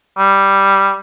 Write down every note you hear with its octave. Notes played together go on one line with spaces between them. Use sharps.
G3